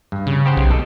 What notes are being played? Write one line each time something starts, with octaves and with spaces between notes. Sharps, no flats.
G2
C#3
G4 C5 F#5
B1
A4 D#5